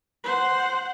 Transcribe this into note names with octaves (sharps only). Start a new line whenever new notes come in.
C5 F#5